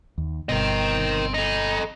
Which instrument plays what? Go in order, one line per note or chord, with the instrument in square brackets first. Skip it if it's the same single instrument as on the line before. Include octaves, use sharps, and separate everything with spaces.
[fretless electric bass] D#2
[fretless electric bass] G1 G2 B2 [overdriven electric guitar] C4 [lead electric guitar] A#4 D#5
[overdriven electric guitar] D#4 [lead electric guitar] A4 D#5